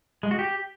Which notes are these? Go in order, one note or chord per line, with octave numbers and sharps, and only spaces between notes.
G#3
F#4
G4